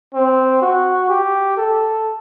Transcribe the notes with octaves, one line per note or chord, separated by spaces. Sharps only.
C4
F#4
G4
A4